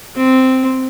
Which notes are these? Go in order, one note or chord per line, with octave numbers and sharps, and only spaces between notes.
C4